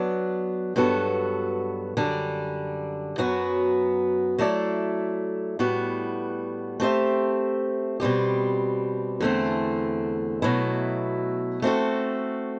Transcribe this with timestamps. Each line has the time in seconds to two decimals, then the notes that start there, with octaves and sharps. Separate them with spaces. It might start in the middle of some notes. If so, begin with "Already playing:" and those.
Already playing: F#3 B3 D4
0.76 G2 F#3 B3 F#4 A4
1.97 F#2 D3 G3 D4
3.18 F#2 F#3 B3 F#4
4.38 F#3 A3 E4 A4 D5
5.59 A2 G3 B3 F#4
6.80 A3 C4 G4 C5 E5
8.00 B2 G3 C4 G4
9.21 E2 D3 A3 C4
10.42 B2 F#3 A3 E4
11.62 A3 C4 F#4 A4